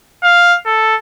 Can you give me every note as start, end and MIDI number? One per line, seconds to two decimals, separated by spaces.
0.23 0.58 77
0.66 0.96 69